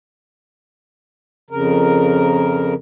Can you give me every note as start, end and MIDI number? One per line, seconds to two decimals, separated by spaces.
1.50 2.74 41
1.50 2.74 49
1.50 2.74 70